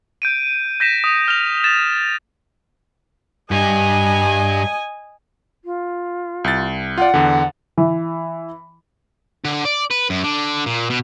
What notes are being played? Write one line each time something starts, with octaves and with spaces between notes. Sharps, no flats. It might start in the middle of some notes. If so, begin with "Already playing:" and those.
G6 D7 D#7
G6 A#6 B6 E7
D#6
F6 A#6 F7
A6 E7
G2 G3 D#5 G#5
F4
C2 A6
F4 D5 F#5
E2 D3
E3
D3
D5
B4
F#2
D3
A#2
B2